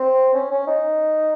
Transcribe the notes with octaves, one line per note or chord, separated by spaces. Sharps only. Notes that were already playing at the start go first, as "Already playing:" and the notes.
Already playing: C4
C#4
C#4
D#4